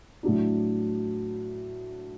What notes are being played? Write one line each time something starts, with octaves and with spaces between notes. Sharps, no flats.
A2 F#3 D4